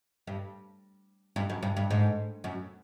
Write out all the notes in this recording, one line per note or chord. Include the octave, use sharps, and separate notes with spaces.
G2
G2
F#2
G2
G2
G#2
F#2